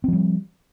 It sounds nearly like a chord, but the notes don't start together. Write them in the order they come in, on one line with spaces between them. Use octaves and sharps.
C4 F3 G3